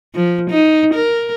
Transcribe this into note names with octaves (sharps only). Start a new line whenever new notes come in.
F3
D#4
A#4